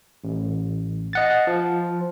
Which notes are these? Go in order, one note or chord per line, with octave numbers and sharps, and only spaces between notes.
A1
D#5 F#5 A6
F3